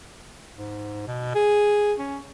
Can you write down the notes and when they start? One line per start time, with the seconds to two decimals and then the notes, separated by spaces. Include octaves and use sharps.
0.57 G#2
1.07 B2
1.35 G#4
1.99 C#4